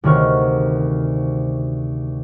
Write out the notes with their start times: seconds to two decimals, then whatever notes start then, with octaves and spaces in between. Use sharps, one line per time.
0.04 D2 C3 D#3 F#4 C#6 F6